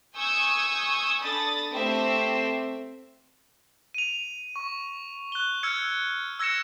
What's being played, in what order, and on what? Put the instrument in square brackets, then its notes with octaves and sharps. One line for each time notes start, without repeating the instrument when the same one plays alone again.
[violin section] G#5 C#6 D#6 E6 G6 G#6
D4 A4 B5 D#6 A6
A3 C4 G4 C5 E5
[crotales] D#7 F7
C#6
F#6 G7
E6 F6 G#6 C#7
E6 G#6 A#6 C#7 E7